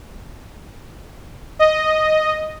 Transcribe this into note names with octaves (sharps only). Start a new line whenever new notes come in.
D#5